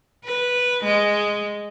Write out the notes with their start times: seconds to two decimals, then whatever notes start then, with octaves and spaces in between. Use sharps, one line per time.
0.24 B4
0.84 G#3